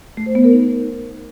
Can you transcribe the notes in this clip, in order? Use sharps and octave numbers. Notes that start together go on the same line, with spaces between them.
A3
C5
B3
A#4
D#4